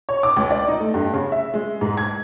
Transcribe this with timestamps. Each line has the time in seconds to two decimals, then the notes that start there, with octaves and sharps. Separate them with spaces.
0.09 C#5
0.23 D6
0.36 C#2
0.51 D5
0.68 D#4
0.80 A3
0.94 G2
1.13 C#3
1.32 E5
1.54 G#3
1.81 G#2
1.97 G#6